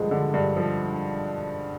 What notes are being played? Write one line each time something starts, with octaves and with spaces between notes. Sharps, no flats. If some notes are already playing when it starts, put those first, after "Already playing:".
Already playing: G2 D3 F3 G#3
D3
G2
F3